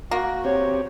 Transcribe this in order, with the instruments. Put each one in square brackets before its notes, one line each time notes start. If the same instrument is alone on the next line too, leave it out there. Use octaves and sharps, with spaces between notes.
[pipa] A#3 [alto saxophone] F#4
[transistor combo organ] C4 G4 [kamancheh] C#5